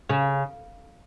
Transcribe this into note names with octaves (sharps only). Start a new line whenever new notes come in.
C#3